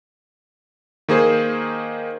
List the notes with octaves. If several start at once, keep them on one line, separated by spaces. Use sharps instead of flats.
D#3 A#3 G#4 C5